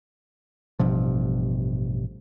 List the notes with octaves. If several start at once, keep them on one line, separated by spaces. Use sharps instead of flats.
A1 G2 B2 F3